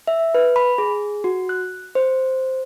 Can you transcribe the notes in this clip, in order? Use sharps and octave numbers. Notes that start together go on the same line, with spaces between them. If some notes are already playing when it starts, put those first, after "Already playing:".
E5
B4
B5
G#4
F#4
F#6
C5